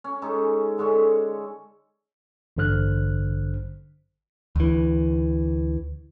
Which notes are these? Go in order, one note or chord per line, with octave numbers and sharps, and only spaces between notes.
C#4
G#3 C#4 D#4 A4
D3 G#3 C#4 A4
A1 G2 D3 C5 F6 F#6
D2 E3